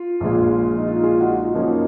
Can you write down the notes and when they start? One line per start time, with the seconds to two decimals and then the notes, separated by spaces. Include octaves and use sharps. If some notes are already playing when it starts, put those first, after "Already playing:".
Already playing: F4
0.20 A#1 A#2 G#3
0.78 D#4
0.88 F4
1.03 F4 G#4
1.20 D#4 F#4
1.37 F4
1.54 F#2 F3 A#3 C#4 D#4